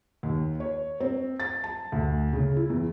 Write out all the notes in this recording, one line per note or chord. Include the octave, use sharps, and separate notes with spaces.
D#2
C#5
C4
A6
A5
D2
C#3
E4
E2